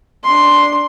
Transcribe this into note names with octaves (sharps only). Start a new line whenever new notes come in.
D4 C6